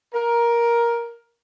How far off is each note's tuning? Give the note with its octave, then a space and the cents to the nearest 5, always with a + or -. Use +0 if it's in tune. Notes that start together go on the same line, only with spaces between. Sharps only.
A#4 +10